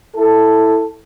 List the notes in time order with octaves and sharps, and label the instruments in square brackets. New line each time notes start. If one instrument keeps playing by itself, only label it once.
[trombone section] E4 A4